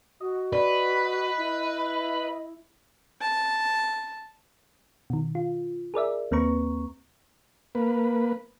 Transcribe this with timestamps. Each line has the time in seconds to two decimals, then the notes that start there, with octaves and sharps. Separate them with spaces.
0.20 F#4 D#5
0.53 B4 D5
1.38 E4
3.21 A5
5.10 B2 D#3
5.35 F4
5.94 G#4 A#4 D5 E5
6.31 D#2 A#3 C4 B4 A#5 C#6
7.75 A#3 B4